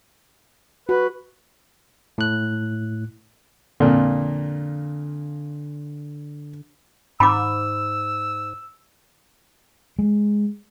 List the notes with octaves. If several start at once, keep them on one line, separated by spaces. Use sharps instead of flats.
F#4 B4
A2 F#6
F2 A#2 D3
G#2 B5 D6 E6
G#3